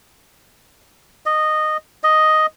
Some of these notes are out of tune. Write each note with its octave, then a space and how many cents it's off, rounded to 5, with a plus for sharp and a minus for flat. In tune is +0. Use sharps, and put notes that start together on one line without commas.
D#5 -15
D#5 +0